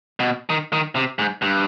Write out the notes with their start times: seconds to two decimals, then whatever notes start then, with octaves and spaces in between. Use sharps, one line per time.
0.20 B2
0.50 D#3
0.73 D#3
0.96 C3
1.19 G#2
1.42 G2